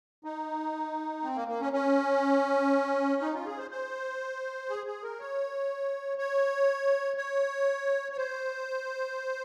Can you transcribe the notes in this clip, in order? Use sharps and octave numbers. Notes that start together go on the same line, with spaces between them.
D#4
C4
A#3
A#3
C#4
C#4
D#4
F4
G#4
C5
C5
G#4
G#4
A#4
C#5
C#5
C#5
C#5
C5